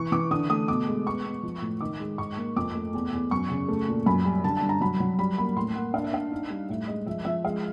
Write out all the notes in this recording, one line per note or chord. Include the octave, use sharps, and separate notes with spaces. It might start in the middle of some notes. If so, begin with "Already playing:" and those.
Already playing: E3 C#6
E3 D6
D3 D#6
A3 D#6
B2 D6
G#3
B3 C#6
B3
F3
A2
D#3 D6
G#3
G#2 C#6
A#3
F2 D6
A3
E2
E2
F#2 C#6
C#3
A3
A#2
F#2 B5
G3
D3 A5
A5
G2
A#5
F#3 B5
F#3
G3 B5
A#3 B5
A2 C6
A#3 F#5
D4 F5
E5
D4 F5
D#4
G3
A2 E5
G#3 D#5
F3 E5
F3 E5
G#3 F5